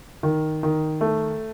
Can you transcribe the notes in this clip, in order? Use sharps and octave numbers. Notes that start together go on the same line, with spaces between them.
D#3
D#3
A3